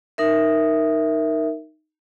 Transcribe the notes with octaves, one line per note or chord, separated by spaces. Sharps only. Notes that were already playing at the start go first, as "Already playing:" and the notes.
D#4 A#4 E5